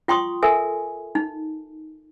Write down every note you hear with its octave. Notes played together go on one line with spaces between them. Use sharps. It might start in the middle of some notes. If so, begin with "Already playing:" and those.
F4 G5 C6 C#6 D#6
A4 A#4 E5 G#5
D#4